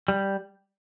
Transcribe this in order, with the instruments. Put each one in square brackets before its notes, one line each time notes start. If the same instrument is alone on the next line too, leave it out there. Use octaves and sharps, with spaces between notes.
[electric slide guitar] G3